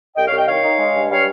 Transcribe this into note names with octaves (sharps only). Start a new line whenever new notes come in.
C2 D#5 G5
C#5 F5
C2 D#5 G5
D#3 C#5 F5
D#4
G#3
G2
G3 C#5 F5